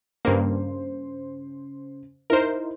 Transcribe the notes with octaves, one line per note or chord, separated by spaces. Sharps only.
G2 C#3 A#3 C5
D#4 E4 A#4 C5